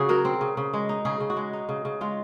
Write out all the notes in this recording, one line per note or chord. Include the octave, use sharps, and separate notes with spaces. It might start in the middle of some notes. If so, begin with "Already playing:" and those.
Already playing: C#3 F#4 G#4
F#3 A#4
C4
C#3
C#3
G#3
D#4
C#3 G#4
C#3
F#4
G#3
D#4
C#3
C#3
G#3 F4